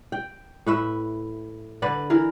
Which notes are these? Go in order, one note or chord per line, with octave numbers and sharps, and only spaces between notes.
G5
A2 B4 E5
D3 B4 D5
E3 E4 A#4